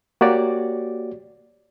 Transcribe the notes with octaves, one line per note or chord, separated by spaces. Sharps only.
A#3 F#4 G4 C#5 D5